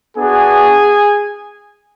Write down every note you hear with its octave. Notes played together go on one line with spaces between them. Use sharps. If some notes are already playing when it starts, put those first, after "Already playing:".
B3 D4 F#4 G#4 G#5